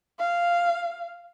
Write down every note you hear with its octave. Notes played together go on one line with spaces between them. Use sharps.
F5